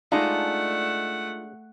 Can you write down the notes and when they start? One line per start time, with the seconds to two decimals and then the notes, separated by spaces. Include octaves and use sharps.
0.12 G#3 A3 D4 D#4 F4 F#5